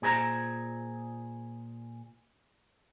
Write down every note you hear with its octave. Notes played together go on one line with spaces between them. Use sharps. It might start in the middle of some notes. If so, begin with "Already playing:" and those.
A#2 G#4 A#4 C5 A#5